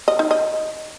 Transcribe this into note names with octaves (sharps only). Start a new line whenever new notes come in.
D#5
D#4
D#5